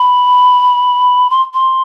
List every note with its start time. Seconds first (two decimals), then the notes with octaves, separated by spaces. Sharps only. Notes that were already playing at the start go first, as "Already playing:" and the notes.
Already playing: B5
1.30 C6
1.54 C6